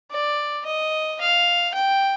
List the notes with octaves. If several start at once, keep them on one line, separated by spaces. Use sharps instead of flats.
D5
D#5
F5
G5